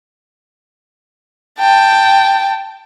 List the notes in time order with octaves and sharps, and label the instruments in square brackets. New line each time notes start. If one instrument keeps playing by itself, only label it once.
[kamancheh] G5 A5